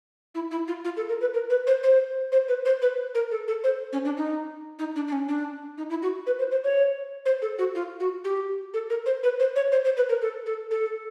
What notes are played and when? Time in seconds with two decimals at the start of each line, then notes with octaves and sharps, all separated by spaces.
0.35 E4
0.51 E4
0.68 F4
0.85 F4
0.97 A4
1.09 A#4
1.21 B4
1.34 A#4
1.50 B4
1.67 C5
1.83 C5
2.32 C5
2.48 B4
2.65 C5
2.82 B4
3.15 A#4
3.31 A4
3.48 A4
3.64 C5
3.93 C#4
4.05 D4
4.17 D#4
4.79 D#4
4.96 D4
5.08 D4
5.12 C#4
5.29 D4
5.78 D#4
5.90 E4
6.02 F#4
6.27 B4
6.39 C5
6.51 C5
6.64 C#5
7.26 C5
7.42 A4
7.59 F#4
7.75 F4
8.00 F#4
8.24 G4
8.74 A4
8.90 A#4
9.06 C5
9.23 B4
9.40 C5
9.56 C#5
9.72 C5
9.85 C5
9.97 B4
10.09 A#4
10.22 A4
10.46 A4
10.71 A4